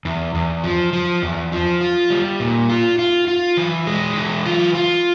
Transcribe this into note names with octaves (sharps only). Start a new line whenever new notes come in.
E2
E2
F3
F3
E2
F3
F4
G3
A#2
F4
F4
F4
E3
G#3
E3
F4
F4